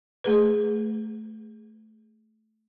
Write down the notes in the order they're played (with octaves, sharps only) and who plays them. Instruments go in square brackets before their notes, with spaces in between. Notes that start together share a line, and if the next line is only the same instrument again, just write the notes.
[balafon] A3 G#4 B4